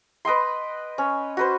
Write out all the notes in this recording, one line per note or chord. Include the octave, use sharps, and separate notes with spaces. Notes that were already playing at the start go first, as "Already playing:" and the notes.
B4 D#5 G5 C6
C#4
F#4 B4 C5